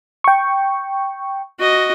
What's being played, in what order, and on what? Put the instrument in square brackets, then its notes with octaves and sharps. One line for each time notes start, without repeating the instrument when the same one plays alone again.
[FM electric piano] G5 C#6
[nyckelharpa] F#4 D#5